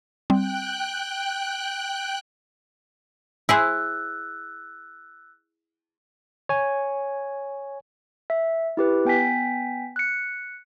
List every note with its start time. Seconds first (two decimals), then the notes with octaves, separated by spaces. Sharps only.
0.30 G3 C4 G5 F#6
3.49 E4 G#4 C5 E6 F#6
6.49 C#5 G#5
8.30 E5
8.77 E4 G4 B4
9.05 B3 G5 G#5 B6
9.96 F#6 C#7